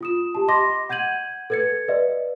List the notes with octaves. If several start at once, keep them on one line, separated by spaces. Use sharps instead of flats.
F4 D#6 E7
G4 A5
D#5 B5 C6 D6 A#6
F#5 G6 G#6 D#7 F#7
A4 B4 G#6 A6 C#7
B4 D5 D#5 F5